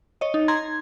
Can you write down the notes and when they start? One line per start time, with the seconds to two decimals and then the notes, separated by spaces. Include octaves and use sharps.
0.21 C#5 D#5
0.34 D#4
0.48 A#5 C6 G#6